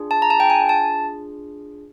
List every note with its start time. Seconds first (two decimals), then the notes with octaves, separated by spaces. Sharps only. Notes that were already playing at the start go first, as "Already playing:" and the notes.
Already playing: D4 F4 G#4
0.11 A5
0.22 A#5
0.30 A5
0.40 G5
0.50 G#5
0.69 A5